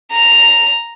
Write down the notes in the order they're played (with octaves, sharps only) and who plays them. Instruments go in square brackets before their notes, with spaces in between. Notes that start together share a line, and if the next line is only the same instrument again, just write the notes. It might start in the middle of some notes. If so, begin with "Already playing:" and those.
[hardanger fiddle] A#5